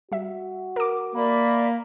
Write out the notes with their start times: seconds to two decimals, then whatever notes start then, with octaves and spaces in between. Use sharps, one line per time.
0.12 G3 F#4 E5
0.76 A#4 D6
1.15 A#3 D5 E5 B5